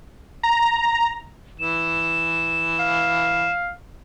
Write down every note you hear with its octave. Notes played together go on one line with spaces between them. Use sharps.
A#5
E3 E7
F5